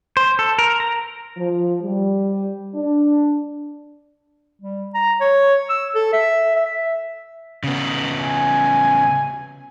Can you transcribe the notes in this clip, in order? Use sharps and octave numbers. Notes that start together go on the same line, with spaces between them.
C5
A4
A#4
A#5
F3
G3
D4
G3
A#5
C#5
E6
A4
E5
E5
C#3 B3
G#5